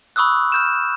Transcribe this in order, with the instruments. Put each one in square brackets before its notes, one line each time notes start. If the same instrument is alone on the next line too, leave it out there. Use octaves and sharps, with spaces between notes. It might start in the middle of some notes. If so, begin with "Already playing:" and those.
[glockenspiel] B5 C#6 D#6 E6 F#6
F6 G6 E7